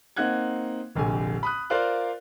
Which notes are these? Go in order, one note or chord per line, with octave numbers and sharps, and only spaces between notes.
A#3 C4 D#4 F#5 F#6 G#6
F1 A#1 D3 G#5
B5 D#6 F#6
F4 A#4 C5 D5 F5 F#6